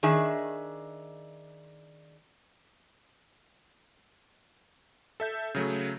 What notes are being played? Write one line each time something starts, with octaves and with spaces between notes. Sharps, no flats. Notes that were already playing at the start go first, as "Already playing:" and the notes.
D#3 D4 G#4 D#5 E5
A4 E5 G6
C#3 F#3 A3